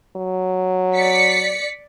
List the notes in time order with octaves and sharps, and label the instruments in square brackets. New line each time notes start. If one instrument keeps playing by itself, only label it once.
[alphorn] F#3
[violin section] D5 B6 C#7